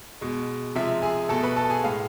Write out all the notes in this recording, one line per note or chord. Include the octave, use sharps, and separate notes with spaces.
B2 G#3
C3 F3 G#3 E5
G#4 G#5
B2 A3 A4 A5
B4 B5
A4 A5
G#4 G#5
A2 G#3 F5